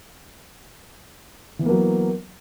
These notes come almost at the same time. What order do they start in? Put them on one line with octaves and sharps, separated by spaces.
E3 B3 A#3 F#3